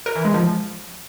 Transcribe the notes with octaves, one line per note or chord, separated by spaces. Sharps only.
A#4
E3
G#3
F3